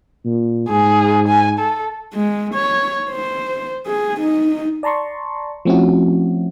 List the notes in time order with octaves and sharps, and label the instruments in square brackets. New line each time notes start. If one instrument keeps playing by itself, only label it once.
[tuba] A#2
[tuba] G#2 [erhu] G#4
[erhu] G#5
A4
[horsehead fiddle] G#3
C#5
C5
G#4
D#4
[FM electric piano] D5 A5 A#5 C6 C#6
F3 A3 C4 C#4 E4 F#4